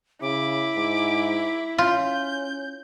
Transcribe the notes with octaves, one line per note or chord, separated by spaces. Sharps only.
C#3 E4 D6
G#2
C#4 F4 G6